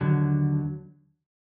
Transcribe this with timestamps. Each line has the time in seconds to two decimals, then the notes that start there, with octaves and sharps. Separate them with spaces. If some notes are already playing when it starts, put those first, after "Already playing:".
0.01 D#2 D3 F#3